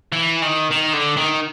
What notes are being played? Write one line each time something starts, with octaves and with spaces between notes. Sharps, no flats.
E3
D#3
D#3
D3
D#3